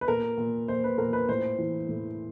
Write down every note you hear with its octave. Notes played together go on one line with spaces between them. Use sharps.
B4
A#2 A#4
A#2
A#2 C5
B4
A#2 A#4
B4
A2 C5
E3
A2